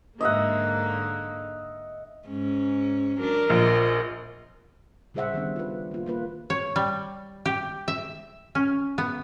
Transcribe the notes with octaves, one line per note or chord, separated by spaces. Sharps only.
G#2 D3 A#3 D#5 E5 F#5
G#2 C#4
F#3 D4 A#4 D5
A#1 F4 D#5
C#3 G3 G#4 C5 E5 F#5
D#3 G3 B3 D4
F4 B4
A#3 F4
A#3 F4 B4
C#5
G3
G4
E5
C#4
B3